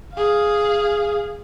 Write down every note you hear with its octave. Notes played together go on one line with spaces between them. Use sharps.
G#4 F5